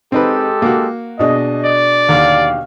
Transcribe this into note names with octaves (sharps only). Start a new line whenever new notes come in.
G#3 C4 D#4 G4 A4 B4
A#3 F#4
B2 D4 G#4 D#5
D5
D#2 D3 G4 F5 D6